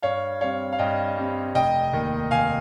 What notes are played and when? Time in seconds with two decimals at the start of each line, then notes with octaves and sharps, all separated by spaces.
0.02 G2 C#5 F5
0.41 G3 C4 C#5 F5
0.72 F5
0.78 G2 D#5 G5
1.17 G3 C4
1.55 F1 D#5 G5
1.93 D#2 D#3
2.31 F1 F5 G#5